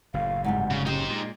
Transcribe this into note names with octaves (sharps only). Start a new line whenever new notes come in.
F#1 A2 F5
G#2 C3 G3 F#5
C#3
C#3 D#4 G4 C5
A#2 G#3